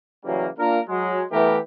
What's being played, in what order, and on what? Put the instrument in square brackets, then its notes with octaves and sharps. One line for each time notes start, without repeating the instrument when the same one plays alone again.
[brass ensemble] C#3 E3 F#3 G3 A#3
A#3 D4 F4 A#4
F#3 G#3
E3 A3 B3 E4 G4 A#4